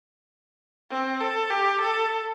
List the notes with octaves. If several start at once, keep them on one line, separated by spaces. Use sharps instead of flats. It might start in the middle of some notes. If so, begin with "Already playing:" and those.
C4
A4
G4
A4